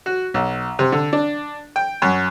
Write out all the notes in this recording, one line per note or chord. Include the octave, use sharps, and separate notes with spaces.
F#4
B1
C3
D3
D4
G5
F#2